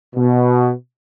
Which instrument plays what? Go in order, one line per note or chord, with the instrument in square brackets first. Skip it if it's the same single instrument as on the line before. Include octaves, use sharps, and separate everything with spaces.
[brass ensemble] B2